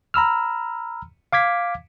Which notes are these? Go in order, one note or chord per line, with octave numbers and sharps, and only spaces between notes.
A#5 B5 E6 F6
F5 D6 G#6 B6